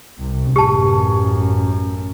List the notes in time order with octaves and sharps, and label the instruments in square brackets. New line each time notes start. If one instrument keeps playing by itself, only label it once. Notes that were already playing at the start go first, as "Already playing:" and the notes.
[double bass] C2 C3
[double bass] A1 F#2 [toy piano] G4 A5